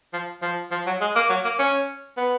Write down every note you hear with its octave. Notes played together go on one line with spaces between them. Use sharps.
F3
F3
F3
F#3
G#3
A#3
F#3
A#3
C#4
B3